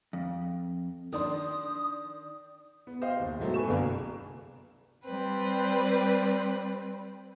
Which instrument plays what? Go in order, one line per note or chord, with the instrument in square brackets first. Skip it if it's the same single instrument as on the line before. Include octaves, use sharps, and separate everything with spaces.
[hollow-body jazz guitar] F2
[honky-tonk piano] D#3 D4 C6 [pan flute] D#6
[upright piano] B3
C5 D#5 F5 G5
D#2
G#2 B2 F#3 A3
B4 G#5 C#6 E7
G1 C2 D3 A#3 A#4
[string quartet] G3 C4 B4